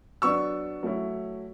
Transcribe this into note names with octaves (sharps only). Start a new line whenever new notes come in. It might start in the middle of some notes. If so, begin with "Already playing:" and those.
F#3 B3 D4 C#6 E6
F#3 A3 C#4 E4